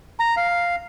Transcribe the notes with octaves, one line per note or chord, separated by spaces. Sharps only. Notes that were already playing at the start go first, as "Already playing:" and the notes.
A#5
F5